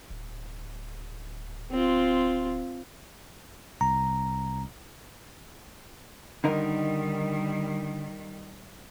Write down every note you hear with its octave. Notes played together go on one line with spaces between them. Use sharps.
D1
C4 F4
C2 A#5
D3 D#3 G3 D#4 A#4